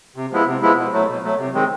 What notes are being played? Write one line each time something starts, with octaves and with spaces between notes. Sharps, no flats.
C3
F3 G#3 B3 E4
C3
F3 G#3 B3 E4
B2
F#3 A3
B2
F#3 A3
C3
D#3 G#3 C4